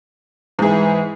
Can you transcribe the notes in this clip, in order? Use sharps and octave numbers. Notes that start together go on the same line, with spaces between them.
G#2 E3 G#4